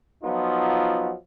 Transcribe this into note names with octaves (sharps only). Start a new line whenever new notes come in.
F3 F#3 B3 D#4 F4